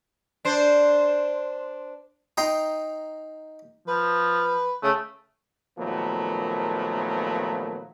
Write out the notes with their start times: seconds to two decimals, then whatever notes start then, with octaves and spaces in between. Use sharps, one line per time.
0.45 D4 C5
2.37 D#4 G5 A#5 C6 D#6
3.88 F3 B4
4.83 C#3 A3
5.78 D#2 A#2 F3 F#3 A3 B3